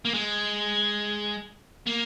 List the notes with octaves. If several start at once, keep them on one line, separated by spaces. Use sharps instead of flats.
A#3
G#3
A#3